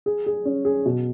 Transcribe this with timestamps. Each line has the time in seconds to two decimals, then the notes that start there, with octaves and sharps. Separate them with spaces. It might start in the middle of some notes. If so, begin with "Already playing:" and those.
0.06 G#4
0.26 G#4
0.45 C#4
0.65 G#4
0.85 B2